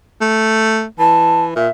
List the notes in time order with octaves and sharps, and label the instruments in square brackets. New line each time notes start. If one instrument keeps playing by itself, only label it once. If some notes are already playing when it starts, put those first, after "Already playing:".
[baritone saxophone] A3
[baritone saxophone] E3 [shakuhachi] A5
[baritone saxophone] A#2 [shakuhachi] E5